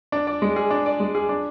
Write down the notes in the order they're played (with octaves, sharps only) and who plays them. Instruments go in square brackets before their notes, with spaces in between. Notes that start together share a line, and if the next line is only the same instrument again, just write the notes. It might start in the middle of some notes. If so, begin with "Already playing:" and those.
[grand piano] D4
D5
G#3
G#4
D4
D5
G#3
G#4
D4